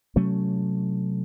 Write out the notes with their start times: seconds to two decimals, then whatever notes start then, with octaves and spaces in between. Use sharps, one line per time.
0.16 C3 F#3 A3 C#4